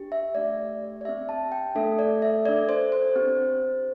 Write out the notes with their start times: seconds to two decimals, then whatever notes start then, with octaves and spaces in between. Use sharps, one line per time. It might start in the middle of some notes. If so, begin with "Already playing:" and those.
Already playing: D4 G4
0.12 E5
0.35 A3 D4 G4 D5
1.01 D5
1.05 C4 G4 E5
1.29 A5
1.52 G5
1.75 A3 D4 A4 E5
1.99 D5
2.22 E5
2.45 D4 A4 D5
2.69 C5
2.92 C5
3.16 C4 G4